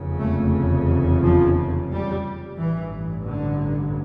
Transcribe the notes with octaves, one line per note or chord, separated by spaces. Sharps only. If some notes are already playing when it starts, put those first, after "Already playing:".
Already playing: F1 E2 C#3
A3
F3
G3
A1 G2 E3
D3